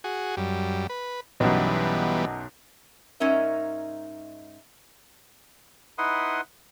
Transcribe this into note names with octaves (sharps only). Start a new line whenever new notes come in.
F#4 G#4
F#2 G3
B4
B1 F#2 E3 G3 B3
G#2 C#4 D#4 A#4 E5
D#4 E4 B4 F#5 C6 D#6